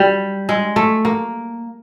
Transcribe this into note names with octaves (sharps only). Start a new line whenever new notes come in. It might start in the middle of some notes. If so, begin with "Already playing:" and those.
Already playing: G3
G#3
A3
A#3